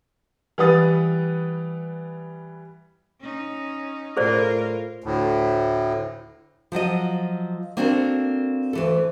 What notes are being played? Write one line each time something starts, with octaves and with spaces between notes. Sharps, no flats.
E3 G3 B4 F#5 D#6 A6
C#4 D#4
A2 F4 G#4 A#4 C5 D5
D2 A2
F3 F#3 F#4 D#5
A#3 C4 D4 F#4 A4 A#4
D2 E3 A4